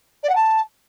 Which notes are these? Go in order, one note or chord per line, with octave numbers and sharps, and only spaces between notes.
D5
F#5
A5